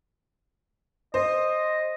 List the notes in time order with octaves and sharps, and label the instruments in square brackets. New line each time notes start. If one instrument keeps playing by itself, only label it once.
[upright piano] C5 [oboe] D#5